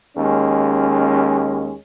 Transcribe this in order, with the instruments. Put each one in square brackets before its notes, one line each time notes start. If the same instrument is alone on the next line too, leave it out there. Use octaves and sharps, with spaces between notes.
[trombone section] D#2 G#3 C#4